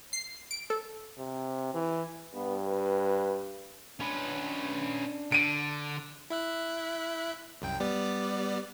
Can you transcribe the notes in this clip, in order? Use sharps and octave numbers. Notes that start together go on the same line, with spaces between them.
C7
D7
A4
C3
E3
G2 B3
B4
C#4 D4 B4
D3 D7 D#7
E4 E5 F#6
C2 F#2 G5
G3 B3 D5